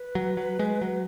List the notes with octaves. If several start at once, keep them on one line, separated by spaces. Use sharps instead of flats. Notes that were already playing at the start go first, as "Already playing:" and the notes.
Already playing: B4
F#3
F#3
G#3
F#3